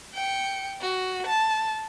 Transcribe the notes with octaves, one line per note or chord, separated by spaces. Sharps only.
G5 C#7
F#4
A5